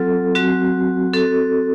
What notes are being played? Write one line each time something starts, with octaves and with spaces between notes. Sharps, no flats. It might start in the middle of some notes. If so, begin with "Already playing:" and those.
Already playing: F#3 C4 F4 A4
F#3 C4 F#4
C4 F#4 A4